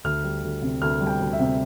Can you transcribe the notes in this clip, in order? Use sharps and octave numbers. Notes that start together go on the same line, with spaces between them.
D2 F6
G3
D2
C3
D2 F6
G3
G5
D2
E5
C3